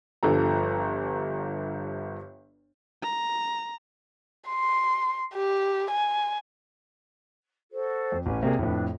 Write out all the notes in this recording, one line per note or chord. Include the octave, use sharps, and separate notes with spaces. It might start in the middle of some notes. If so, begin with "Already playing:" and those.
G1 G2 F3 A4 A#5
A#5
C6
G4
G#5
F#4 A4 C5
F2
A1 C#4 G4 G#5
C3 A#3 F#4 G#4 D5
F2 A2 D4 B4